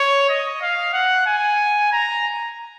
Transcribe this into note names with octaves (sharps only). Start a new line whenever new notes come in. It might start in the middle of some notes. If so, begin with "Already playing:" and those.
Already playing: C#5
D#5
F5
F#5
G#5
A#5